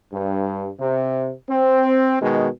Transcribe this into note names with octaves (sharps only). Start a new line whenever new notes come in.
G2
C3
C4
B2 D#3 G#3